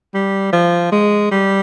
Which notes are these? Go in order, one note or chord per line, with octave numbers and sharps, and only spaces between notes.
G3
F3
G#3
G3